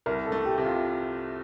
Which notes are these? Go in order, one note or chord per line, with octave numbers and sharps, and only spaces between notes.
C2 A#4
A4
A3
G4
C3
F4